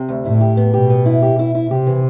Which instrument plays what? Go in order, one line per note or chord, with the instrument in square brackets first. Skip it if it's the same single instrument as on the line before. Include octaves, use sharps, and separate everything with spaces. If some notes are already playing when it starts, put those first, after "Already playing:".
Already playing: [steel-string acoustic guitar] C3
D2
[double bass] A2 [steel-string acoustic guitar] E4
[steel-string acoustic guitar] G4
B3
[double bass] B2 [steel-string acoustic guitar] G4
[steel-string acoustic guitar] B3
E4
G4
E4
E4
[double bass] C3 [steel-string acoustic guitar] G4
[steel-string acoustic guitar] E3